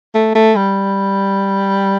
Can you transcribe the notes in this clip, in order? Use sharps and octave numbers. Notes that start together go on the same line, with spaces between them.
A3
A3
G3